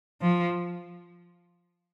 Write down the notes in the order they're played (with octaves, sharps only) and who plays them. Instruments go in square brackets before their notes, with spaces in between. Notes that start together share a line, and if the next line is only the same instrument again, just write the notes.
[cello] F3